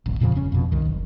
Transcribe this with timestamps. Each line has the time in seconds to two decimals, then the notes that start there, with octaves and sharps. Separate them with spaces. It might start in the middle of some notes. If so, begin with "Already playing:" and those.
0.06 D#1 A1
0.20 F2 A#2 C#3 F3
0.35 G1 C#4
0.52 F2 B2
0.72 C2 D#3
0.85 F#1